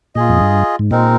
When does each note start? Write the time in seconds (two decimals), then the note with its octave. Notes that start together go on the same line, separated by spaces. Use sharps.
0.15 A#2 F4 G#4 D#5
0.29 F2
0.41 G2
0.79 G#2
0.91 A#2 G#3 C4 D#4 A#4